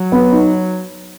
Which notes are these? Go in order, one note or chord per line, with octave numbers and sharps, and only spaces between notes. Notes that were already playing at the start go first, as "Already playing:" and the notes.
Already playing: F#3
B3
D#4